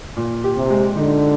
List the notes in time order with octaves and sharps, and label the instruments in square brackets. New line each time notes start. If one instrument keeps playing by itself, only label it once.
[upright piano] A#2
G4
[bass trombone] C3
[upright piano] G#3
[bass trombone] D3 [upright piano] D#4